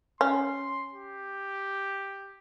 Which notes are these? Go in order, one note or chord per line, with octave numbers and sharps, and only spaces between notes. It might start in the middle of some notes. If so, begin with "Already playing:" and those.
C#4 C6
G4